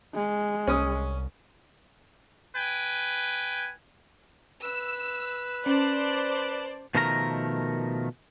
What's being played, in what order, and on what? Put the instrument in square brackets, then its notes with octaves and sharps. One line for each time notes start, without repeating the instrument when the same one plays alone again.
[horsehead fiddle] G#3
[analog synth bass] C2 [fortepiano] C#4 D#6
[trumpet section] B4 G5 G#5
[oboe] B4 [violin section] E6
[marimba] C#4 [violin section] C5 D5 A5
[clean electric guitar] B2 D#3 F3 A3 A#4 A#5